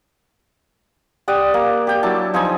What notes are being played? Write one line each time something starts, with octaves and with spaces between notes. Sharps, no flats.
G4 D5 F#5 D#6
A#3
G4 G5
F#3 D4 E4 A5
F3 D#4 C5 G#5